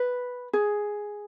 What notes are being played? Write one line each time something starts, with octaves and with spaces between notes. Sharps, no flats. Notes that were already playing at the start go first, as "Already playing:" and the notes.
Already playing: B4
G#4